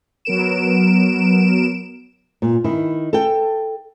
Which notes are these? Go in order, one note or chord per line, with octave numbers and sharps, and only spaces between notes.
F#3 B3 A#4 D7 E7
A#2
D#3 E4
A4 G5